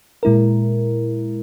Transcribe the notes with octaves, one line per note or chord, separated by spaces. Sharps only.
A#2 G#3 E4 A#4